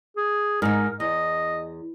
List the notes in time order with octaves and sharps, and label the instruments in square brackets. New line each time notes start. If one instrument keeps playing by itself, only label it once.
[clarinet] G#4
[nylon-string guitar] G#2 D#4 [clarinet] A#4
[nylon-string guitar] E2 [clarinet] D#5